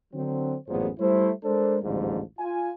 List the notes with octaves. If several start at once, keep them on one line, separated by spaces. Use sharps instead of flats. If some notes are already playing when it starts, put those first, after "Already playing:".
D3 F#3 C4
A1 F#2 A#2 B3 G#4 C5
G3 A3 E4 C5
G#3 D4 A4 A#4 C5
A1 D2 G#2 D3 F3 G3
F4 G#5